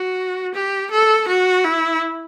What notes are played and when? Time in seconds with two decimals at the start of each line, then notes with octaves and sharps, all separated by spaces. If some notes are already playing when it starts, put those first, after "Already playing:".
Already playing: F#4
0.54 G4
0.91 A4
1.28 F#4
1.64 E4